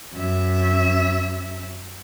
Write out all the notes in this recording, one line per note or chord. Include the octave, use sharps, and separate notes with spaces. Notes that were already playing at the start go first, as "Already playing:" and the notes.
F#2 E5